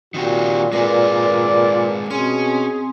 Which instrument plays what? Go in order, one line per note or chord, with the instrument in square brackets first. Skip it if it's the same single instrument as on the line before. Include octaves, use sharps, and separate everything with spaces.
[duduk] A#2 [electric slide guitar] D#3 C4 G4 [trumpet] F#4
[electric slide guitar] G#3 C4 G#4 [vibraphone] A#4 B4 [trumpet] D5
[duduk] B2 [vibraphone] C4 G#5 C6 [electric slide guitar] C#4 [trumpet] G#4